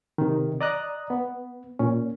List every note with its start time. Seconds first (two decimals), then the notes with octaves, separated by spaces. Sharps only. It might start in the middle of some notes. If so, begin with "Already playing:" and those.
0.18 C3 D#3
0.61 D5 D#5 A#5 D#6 F#6
1.10 B3
1.79 A#2 C#4